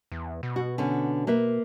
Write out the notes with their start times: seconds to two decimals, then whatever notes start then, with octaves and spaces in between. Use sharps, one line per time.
0.12 E2
0.43 B2
0.56 F#4
0.78 D3 B3 C#4
1.27 A#3 B4 E5